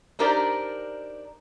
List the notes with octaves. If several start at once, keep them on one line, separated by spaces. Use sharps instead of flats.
D4 D#4 G4 A#4 C5 D5